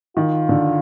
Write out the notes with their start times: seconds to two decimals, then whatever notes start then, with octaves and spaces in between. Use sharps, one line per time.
0.17 D#3 F4
0.49 D3